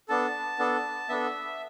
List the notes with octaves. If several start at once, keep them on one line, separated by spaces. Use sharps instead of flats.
B3 D4 A4 A5
B3 D4 A4
B3 D4 A4 E5